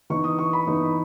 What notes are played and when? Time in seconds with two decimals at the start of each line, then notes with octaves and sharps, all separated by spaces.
0.10 E3 B3 D#4 C#6
0.24 D#6
0.39 C#6
0.53 B5
0.67 E3 B3 D#4